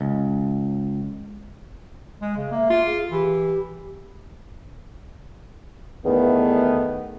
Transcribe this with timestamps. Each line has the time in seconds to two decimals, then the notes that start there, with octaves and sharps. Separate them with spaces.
0.01 C#2
2.22 G#3
2.36 C#3
2.52 A#3 E5
2.70 F4
2.86 G#4
3.11 E3 G4
6.05 E2 D#3 A3 B3